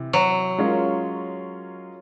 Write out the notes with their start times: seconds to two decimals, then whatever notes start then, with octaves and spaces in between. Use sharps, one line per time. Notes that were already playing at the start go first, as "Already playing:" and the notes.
Already playing: C3 E3
0.13 F#3
0.58 G#3 C#4 F4 A#4